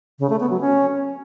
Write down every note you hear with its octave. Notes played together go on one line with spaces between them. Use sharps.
C#3
A3
B3
F#3
C#4